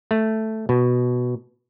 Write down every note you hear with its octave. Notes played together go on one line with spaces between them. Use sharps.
A3
B2